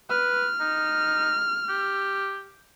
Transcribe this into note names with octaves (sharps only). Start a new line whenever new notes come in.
B4 F6
D#4
G4